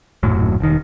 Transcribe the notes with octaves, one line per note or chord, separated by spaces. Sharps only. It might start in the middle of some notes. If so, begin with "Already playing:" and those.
D#1 F#2 A2 F#3
E1 D#3